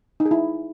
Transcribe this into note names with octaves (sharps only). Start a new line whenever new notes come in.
D#4
G#4
E4